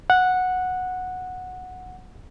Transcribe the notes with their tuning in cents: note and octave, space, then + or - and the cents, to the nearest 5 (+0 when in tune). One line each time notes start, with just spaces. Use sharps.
F#5 -10